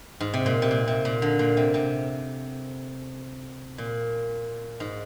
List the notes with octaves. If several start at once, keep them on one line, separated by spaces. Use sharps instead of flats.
G#2
C3
A#2
C3
A#2
C3
A#2
D3
A#2
C3
C3
A#2
G#2